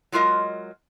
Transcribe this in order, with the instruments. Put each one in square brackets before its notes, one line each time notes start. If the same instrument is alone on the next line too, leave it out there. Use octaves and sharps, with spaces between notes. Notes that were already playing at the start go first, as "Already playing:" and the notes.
[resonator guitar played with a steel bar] F#3 G#3 F4 A#4 D#5